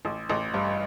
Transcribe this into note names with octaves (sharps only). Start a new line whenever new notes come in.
A1
A1
G2